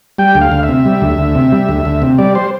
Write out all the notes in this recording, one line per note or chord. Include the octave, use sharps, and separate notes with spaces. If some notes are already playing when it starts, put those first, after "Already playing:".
G3 G5
D2
F5
D2
E5
C3
G3
D2
D2
C3
G3
D2
D2
C3
G3 D5
C5